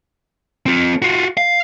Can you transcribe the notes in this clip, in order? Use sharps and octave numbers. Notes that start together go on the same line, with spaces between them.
C4 F4
F4 F#4
F5